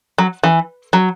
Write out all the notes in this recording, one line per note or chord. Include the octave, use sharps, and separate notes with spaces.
F#3
E3
F#3